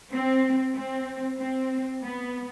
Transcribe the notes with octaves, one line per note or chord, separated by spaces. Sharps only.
C4
C4
C4
B3